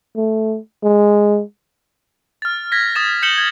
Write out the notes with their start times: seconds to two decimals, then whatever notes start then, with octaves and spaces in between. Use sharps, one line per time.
0.16 A3
0.84 G#3
2.42 F6 A6
2.72 G#6 A#6 B6
2.95 D#6 A6 E7
3.22 G6 C#7 E7 F#7 G7
3.38 G#6